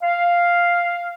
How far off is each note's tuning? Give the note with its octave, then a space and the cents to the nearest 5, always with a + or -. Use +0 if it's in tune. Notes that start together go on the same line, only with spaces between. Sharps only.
F5 +0